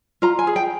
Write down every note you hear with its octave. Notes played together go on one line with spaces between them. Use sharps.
F4 A#5
G#5
G#4
G5